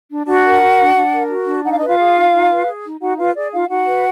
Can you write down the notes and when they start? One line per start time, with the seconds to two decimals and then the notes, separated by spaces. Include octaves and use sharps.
0.10 D4
0.26 D4 F#4 F#5
0.44 A#4
0.61 F#4
0.79 D4
0.95 D4
1.13 A#4
1.29 F#4
1.47 D4
1.63 D#4 F#5
1.70 F5
1.78 D#5
1.81 F4 B4 F5
1.98 G#4
2.16 D#4
2.32 D#4
2.50 B4
2.66 G#4
2.84 D#4
3.00 D#4 F#4 F#5
3.17 F4 B4 F5
3.35 G#4 D5
3.52 D#4 F4 F5
3.68 D#4 F#4 F#5
3.86 B4